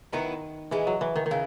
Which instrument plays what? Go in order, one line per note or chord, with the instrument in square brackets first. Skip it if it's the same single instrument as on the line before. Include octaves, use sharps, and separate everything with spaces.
[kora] D#3 [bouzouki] F#3 B3 E4 B4
[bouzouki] A#2 G#3 B3 [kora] E3
[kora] F#3
E3
D#3
D#3
[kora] C#3 [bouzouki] E3